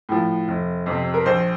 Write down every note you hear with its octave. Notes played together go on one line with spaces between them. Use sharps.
A2 F3
F1
F2 C3
A#4
A#1 C5